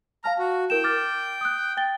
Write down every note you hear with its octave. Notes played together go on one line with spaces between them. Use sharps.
F5 A5 A#5 F6
F#4
E4 A#4 G5 E7
D6 F6 A6
D#6 F#6
G5 A6 G7